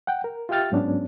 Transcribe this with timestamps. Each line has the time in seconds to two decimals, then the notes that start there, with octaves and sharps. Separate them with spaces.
0.07 F#5 G5
0.24 A#4
0.49 F4 G4 E5 G5 F6 A6
0.72 G#2 F#3 B3 C#4 D4